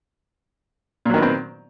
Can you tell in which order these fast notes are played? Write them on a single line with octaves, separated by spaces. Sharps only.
A#2 F#3 D#3 B3 C4